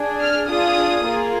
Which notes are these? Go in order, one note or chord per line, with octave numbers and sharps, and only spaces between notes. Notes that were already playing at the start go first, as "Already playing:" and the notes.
Already playing: D4 G#4
F6
D4 F4 G#4 D#6
A#3 F4 G#4